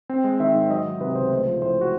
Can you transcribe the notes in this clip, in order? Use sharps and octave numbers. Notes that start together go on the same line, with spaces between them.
C4
G#3
D#3 E5
G#2
F#3 D#5
D#3
C3 B4
C#2 C5
A3 C5
F3
A2 C5
F#4